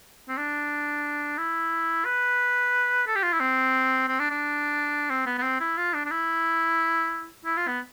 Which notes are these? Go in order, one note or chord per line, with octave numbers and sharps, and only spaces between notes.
C4
D4
E4
B4
A4
G4
F4
E4
C4
C4
D4
D4
C4
B3
B3
C4
E4
F4
D4
D4
E4
E4
F4
B3